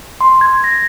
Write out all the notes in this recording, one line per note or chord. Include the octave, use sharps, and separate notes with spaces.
C6
G#6
A#6